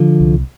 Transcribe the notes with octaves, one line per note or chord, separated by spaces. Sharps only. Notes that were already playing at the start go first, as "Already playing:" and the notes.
Already playing: D3 F3
C2